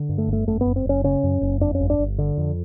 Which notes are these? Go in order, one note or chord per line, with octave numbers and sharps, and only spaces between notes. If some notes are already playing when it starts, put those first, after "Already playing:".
Already playing: D3
G2
A3
G1
A3
F#2 A3
F#1 B3
C4
F#1 C#4
C#3 C#4
F#2
F#1
F2 D4
C#4
G1
D4
G1
D3
F2